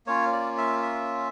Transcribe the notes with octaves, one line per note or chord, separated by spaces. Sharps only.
A#3 C#4 F4 C#5
D5
E5
E5